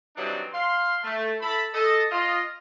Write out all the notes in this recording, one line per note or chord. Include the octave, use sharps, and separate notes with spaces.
E3 F#3 G3 C4 D4 D#4
F5 C6
A3
E4 A4 A5 B5
A4 D#5
F4 D#5